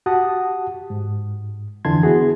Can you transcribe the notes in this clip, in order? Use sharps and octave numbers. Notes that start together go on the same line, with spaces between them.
F#4 G4 F#5 A5 D#6
G#2
F2 D3 E3 A5 C6 G#6
B3 E4 F#4 G#4